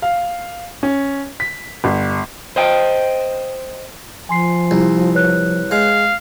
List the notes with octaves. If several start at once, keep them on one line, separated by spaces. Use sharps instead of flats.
F5
C#4
B6
G1
C5 D#5 G5
F3 G#5 C6 C7
C2
B4 C#5 F#6
G#3 F5